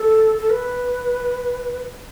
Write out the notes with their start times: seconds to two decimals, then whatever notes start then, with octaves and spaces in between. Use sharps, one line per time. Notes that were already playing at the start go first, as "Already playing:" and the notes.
Already playing: A4
0.38 A4
0.50 B4